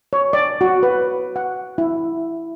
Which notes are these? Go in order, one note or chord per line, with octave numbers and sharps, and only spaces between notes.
C#5
D5
F#4
B4
F#5
E4